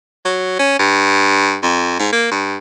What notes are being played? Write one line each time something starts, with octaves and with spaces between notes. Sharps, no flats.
F#3
C#4
G2
F2
G#2
A#3
G2